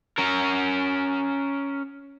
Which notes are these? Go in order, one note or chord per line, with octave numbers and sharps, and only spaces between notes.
C#4 A#4